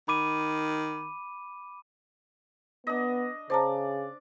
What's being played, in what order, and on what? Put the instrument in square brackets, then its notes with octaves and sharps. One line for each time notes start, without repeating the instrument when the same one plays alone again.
[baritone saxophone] D#3 [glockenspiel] B5 D6 D#7
[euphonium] B3 [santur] D4 D#5
[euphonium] C#3 [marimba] C5 A5 A#5 [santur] D5